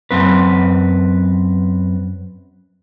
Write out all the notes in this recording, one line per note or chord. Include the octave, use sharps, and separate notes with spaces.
F#2 C4 B4